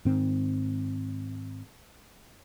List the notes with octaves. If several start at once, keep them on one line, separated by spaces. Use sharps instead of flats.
G#2 D#3 C4